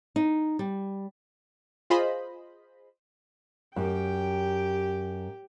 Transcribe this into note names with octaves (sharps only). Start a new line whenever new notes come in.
D#4
G3
F4 G#4 C5 D#5 B5
F#2 G4 G5